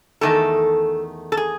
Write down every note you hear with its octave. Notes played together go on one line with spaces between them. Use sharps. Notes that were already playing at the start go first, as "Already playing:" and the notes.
E2 D#3 A3 A4
A4
G#4